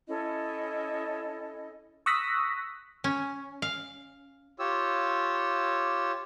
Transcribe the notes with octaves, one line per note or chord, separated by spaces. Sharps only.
C#4 E4 A4 D#5
C#6 D#6 E6 F#6 A#6 B6
C#4
F5
F4 G4 C#5 E6